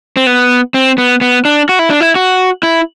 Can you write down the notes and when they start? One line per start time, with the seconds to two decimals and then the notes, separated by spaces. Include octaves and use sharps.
0.17 C4
0.27 B3
0.74 C4
0.98 B3
1.21 B3
1.45 D4
1.69 F#4
1.79 E4
1.90 D4
2.01 E4
2.16 F#4
2.63 E4